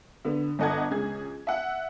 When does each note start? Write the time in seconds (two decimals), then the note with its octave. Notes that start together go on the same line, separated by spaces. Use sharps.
0.25 D3 B3
0.59 G1 A4 D#5 F#5 A5 G#6
0.91 C#2 G#4 G#6
1.47 E5 F#5